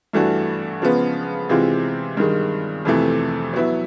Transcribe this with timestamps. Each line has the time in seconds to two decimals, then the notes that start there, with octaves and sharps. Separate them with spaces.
0.13 G2 E3 A3 D4 F#4
0.82 C#3 F3 G#3 B3
1.49 C3 E3 G#3 C4 F4
2.17 G2 D#3 G#3
2.85 F2 C3 E3 A3
3.53 F#3 B3 E4